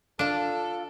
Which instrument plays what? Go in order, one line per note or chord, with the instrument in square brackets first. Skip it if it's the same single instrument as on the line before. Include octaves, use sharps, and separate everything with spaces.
[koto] D4 [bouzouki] F4 F5 [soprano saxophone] A4